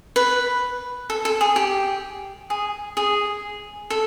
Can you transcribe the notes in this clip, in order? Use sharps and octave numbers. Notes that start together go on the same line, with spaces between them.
B4
A4
A4
G#4
G4
G#4
G#4
A4